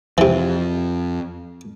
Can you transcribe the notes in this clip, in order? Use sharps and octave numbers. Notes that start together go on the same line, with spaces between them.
F2 C3 E3